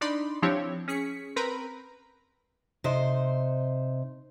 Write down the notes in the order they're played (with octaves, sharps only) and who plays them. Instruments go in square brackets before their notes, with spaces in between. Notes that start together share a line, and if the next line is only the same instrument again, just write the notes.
[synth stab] D4 D#4 D5 B5 C6
F3 C4 D4 E4 G4 C#5
C#4 G#4 B6 C#7
C4 A#4 B4 A#5 B5
[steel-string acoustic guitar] C3 D#4 C5